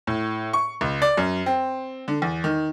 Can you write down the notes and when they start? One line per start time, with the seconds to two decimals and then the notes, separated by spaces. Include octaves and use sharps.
0.07 A2
0.53 C#6
0.81 C#2
1.02 D5
1.17 F#2
1.46 C4
2.08 D3
2.22 E2
2.44 D#3